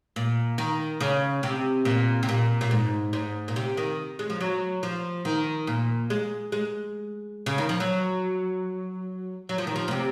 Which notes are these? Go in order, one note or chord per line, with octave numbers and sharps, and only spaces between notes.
A#2
D#3
C#3
C3
A#2
C3
A#2
A#2
G#2
G#2
A#2
C3
D#3
G#3
F3
F#3
F3
D#3
A#2
G#3
G#3
C#3
D#3
F3
F#3
F#3
F3
D#3
F3
A#2
C3